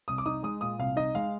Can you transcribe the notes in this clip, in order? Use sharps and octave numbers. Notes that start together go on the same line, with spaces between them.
C2 D#6
D6
D#4 D#6
G#3 D#6
A#2 D#6
C2 F5
D#4 D#5
G#3 F5